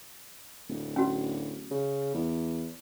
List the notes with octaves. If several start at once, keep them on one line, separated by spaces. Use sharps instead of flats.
D1
C#4 F#4
C#3
E2